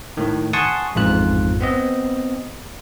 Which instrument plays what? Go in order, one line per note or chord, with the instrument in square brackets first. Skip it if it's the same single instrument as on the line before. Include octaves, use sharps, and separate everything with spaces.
[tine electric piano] A2 D#3
F#5 G#5 A5 C6 C#6 D#6
A1 F2 G#2 F4 F#6
B3 C4 D#5